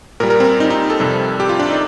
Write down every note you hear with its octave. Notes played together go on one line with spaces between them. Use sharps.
A#2 G3 A#4
A#4
C4
D#4
D#4
A4
F2 C3 G3
G4
F4
D4
D#4